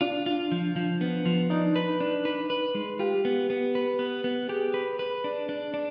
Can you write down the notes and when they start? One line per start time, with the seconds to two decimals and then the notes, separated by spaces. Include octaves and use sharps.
0.01 D4 F4
0.26 F4
0.52 F3
0.76 F3
1.01 B3
1.26 F3
1.50 D4 D#4
1.76 B4
2.00 D4
2.25 B4
2.50 B4
2.75 G#3
2.99 F4 G4
3.25 B3
3.50 B3
3.75 B4
3.99 B3
4.24 B3
4.49 G4 G#4
4.74 B4
4.99 B4
5.24 D4
5.49 D4
5.74 D4